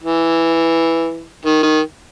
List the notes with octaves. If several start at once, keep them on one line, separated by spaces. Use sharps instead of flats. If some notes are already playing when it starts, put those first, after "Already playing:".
E3
D#3
D#3